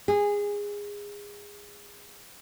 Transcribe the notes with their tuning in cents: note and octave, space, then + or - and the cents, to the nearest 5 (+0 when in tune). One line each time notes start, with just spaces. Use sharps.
G#4 -20